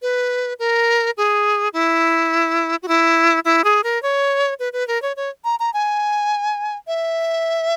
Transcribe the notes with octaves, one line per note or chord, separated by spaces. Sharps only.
B4
A#4
G#4
E4
F#4
E4
E4
G#4
A#4
C#5
B4
B4
A#4
C#5
C#5
A#5
A#5
G#5
E5